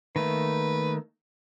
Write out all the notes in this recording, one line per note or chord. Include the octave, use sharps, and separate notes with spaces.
D#3 A3 A#3 B4